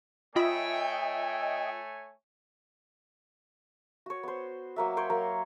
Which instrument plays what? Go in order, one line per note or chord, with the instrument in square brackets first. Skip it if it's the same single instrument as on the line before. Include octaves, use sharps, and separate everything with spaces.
[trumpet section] A3 C#5 G#5 [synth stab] F4 B5 [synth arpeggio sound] D#5 E5 [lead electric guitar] G5
[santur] F#4 C#5
B3 C5
F#3 A#3 E5
C#5 G5 C6
F#3 A#3 A#4